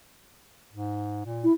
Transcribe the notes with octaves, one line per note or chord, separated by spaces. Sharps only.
G#2
A#2
E4